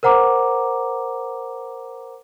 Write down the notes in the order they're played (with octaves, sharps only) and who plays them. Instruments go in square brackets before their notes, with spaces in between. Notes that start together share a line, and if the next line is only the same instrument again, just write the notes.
[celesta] A#4 C5 F#5 A#5 D6